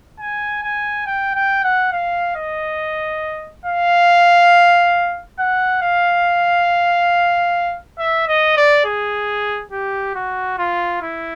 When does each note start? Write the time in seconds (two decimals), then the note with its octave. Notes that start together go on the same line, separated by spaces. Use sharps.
0.20 G#5
0.63 G#5
1.06 G5
1.35 G5
1.64 F#5
1.92 F5
2.36 D#5
3.66 F5
5.39 F#5
5.82 F5
7.99 E5
8.28 D#5
8.57 D5
8.85 G#4
9.72 G4
10.15 F#4
10.59 F4
11.02 E4